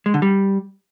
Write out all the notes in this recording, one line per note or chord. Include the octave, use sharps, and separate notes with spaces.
G#3
D3
G3